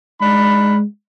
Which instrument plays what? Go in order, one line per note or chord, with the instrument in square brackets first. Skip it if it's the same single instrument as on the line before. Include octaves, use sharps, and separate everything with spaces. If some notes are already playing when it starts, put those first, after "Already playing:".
[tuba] G#3 [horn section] D4 D#4 B5